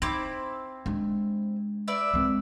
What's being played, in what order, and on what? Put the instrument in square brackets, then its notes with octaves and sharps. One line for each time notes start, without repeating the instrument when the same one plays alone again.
[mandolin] C4 E4 D6 [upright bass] D#4
[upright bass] G#3 D4
[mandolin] B4 D5 E5
[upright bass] G#3 C4